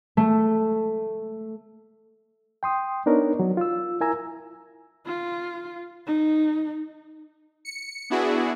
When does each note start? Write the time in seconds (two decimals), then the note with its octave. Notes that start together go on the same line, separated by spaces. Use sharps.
0.17 A3
2.63 G5 C6 D#6
3.06 B3 D4 D#4 A#4 C#5
3.40 F#3
3.57 F4 E6
4.01 E4 A#4 G#5 A#5 E6
5.06 F4
6.07 D#4
7.65 C#7
8.10 B3 D4 E4 F#4 G#4